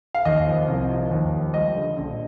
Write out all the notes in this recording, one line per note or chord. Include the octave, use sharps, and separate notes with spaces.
F5
D#2 D#5
F3
C2
F3
D#2
F3
G3 D#5
D3
A#1